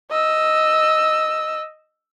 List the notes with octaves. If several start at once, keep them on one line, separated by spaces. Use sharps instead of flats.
D#5 E6